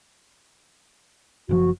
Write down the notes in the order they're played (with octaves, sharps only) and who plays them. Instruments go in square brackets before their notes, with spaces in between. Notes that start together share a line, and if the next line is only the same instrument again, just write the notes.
[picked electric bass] F#1 A2 F3 [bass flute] F#4